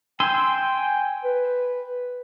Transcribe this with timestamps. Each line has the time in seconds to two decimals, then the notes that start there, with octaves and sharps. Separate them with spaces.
0.20 G5 G#5 C6 E6
1.24 B4